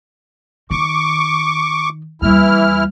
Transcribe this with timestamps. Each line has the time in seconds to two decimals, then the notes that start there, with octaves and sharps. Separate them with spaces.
0.71 D#3 C#6 D6
2.22 D#2 E3 G3 E4 F6